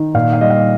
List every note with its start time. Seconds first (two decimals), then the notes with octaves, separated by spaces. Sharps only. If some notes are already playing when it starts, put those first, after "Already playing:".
Already playing: D#3
0.14 A#2 F5
0.33 F5
0.41 G3 D#5
0.50 F5